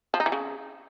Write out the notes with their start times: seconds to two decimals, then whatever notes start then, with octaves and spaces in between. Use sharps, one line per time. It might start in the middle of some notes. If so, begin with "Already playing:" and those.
0.14 F3
0.20 D#4
0.26 E3
0.32 C#3